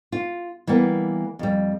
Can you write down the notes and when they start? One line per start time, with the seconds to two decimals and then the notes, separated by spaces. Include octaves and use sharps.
0.12 F4
0.67 E3 G3 A#3 B3
1.39 F2 G3